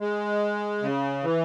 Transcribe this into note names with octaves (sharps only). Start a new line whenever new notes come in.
G#3
C#3
E3